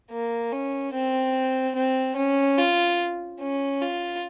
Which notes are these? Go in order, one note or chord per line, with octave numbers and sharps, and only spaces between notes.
A#3
C#4
C4
C4
C#4
F4
C#4
F4